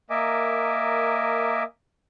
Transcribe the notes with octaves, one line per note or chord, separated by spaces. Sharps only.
A#3 A#4 D#5 E5 G#5 D6